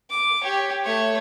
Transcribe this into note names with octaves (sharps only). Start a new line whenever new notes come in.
D6
G4 C#5
A3 C#5